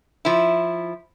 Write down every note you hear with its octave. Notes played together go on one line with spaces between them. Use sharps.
F3 E4